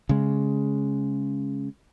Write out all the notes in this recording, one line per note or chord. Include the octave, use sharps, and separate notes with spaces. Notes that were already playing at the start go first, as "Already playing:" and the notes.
C#3 G#3